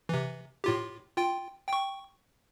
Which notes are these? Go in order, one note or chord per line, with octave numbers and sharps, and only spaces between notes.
C3 E3
A2 F4 G4
F4 G5
G5 C#6